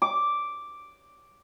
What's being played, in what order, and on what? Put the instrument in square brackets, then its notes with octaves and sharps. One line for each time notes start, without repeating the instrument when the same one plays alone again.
[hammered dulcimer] D6